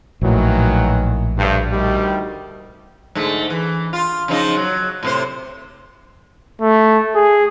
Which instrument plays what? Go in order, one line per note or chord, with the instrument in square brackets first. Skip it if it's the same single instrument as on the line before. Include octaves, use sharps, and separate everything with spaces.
[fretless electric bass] A#1 A2 [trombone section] D#3 E3 F#3
[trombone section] D2 G2
D2 D#3 G3
[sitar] G#2 D3 A3
E3
F4
C#3 F3 D#4
F#3
A2 C3 C5
[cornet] A3
G#4